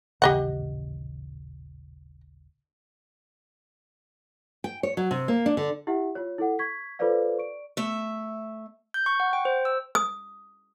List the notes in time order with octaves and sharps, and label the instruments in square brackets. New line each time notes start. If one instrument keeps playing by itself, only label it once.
[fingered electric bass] D#1 A1 C#3 [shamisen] G4 D#5 F#5
[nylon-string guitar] G5
C#5
F#3
C3
A#3
D4
D3
[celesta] E4 G4 E5 F#5
F4 C#5
E4 A4 F#5
C#6 G#6 B6
F4 A4 B4 C5 D5 F5
D5 C#6 D7
[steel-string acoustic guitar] A3 E5
[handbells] G6
C#6
F#5
G5
C5
E6
[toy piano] D#6